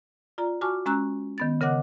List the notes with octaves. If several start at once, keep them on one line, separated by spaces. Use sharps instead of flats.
F4 D5 A#5
F#4 G#5 A5 C#6 D6 F6
G#3 C#4 A#5 E6 F#6
D#3 B3 A6
C#3 A#4 D#5 F#5 D6 F#6